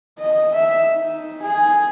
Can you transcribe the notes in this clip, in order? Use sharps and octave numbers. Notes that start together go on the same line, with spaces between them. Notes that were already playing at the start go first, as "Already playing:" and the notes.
D#5
E5
D#4
G#4